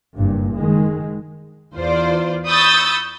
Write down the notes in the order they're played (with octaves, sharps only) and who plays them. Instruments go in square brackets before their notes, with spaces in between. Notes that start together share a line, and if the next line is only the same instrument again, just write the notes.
[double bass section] F#1 G2 A#2
D#3 G#3
[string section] E2 F4 C5 D5
B5 C#6 D#6 E6 G6 A6